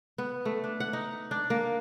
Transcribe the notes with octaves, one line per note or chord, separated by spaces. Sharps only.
B3
A3
D4
F#5
D#4
D4
A#3